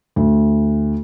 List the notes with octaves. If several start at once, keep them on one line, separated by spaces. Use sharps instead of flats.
D2